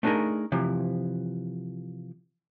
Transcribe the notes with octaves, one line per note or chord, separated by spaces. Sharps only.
A3 B3 D4 D#4 G#4 A#4
C3 E3 F3